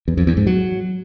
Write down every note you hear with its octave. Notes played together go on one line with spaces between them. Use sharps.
E2
F2
E2
G#2
F#3